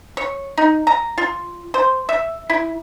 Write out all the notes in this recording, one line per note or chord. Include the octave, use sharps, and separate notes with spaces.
C#5
D#4
A#5
F4
C5
E5
E4